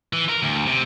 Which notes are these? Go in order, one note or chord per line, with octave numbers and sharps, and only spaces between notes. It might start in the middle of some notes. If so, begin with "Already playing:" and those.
E3
A#4
D2
C3